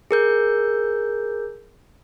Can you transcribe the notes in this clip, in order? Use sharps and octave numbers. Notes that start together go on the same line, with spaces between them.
G#4 A#4 G6